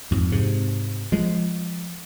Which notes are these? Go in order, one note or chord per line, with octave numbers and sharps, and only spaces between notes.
F2 G#2
G#2 C3
F3 G#3